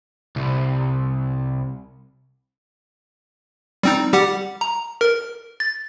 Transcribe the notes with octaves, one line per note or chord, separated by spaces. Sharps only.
C2
G3 C4 D#4
G3 G4 F#5
A#5
A#4
A6